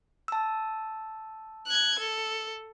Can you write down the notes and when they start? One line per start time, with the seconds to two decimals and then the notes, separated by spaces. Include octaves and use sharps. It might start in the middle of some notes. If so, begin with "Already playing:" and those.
0.28 A5 E6
1.67 F#6 G#6
1.99 A4